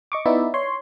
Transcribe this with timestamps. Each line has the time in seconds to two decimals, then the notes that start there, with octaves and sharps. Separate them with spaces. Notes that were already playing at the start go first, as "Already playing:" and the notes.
0.12 D#5 C#6 D6
0.26 B3 D#4 E4 D5 E5
0.54 C#5 C6